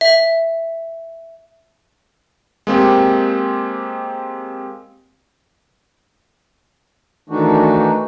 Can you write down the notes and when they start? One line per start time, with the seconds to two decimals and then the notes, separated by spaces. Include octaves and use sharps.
0.01 E5
2.67 G#3 A#3 C4 G4
7.30 D#3 E3 A3 D4 D#4 F#4